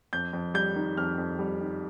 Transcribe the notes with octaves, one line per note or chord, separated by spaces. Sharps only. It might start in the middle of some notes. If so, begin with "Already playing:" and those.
F2 G6
F2
G3 G6
D#3
F2 F6
F2
G3
D#3